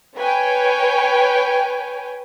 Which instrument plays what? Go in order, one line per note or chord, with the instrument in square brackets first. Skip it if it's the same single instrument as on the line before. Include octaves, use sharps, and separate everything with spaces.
[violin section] B4 C#5 G5 G#5